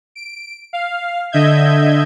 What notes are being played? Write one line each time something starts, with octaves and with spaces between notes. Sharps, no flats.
D7
F5
D3 D#5 E5 G6 G#6